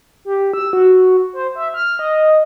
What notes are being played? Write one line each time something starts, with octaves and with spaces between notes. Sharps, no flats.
G4
E6
F#4
C5
E5
F6
D#5